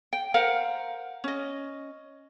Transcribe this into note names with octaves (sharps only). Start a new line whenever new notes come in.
G5
A#4 C5 F5 F#5
C#4 D#5